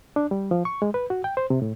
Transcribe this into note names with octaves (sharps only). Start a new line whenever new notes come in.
D4
G3
F3
C#6
G#3
B4
F#4
G5
C5
C3
A2